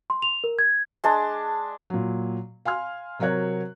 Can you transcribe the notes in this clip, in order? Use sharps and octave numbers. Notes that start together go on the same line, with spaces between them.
C6
F7
A#4
G#6
G#3 D4 A5
A#2 F#3
F5 G#5 C6 F6
C3 F#3 F#4 A#4 C#5 F#6